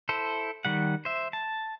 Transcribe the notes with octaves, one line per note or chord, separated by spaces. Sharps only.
E4 A4 C5
D#3 G3 F#5
C5 E5
A5